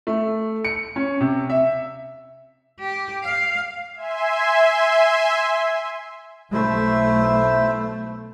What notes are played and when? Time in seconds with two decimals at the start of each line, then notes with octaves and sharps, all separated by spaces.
0.07 A3
0.65 C#7
0.96 C#4
1.21 C3
1.50 E5
2.80 G4
3.23 F5
3.95 E5 G#5 C6
6.53 B1 A3 E4 C5 E5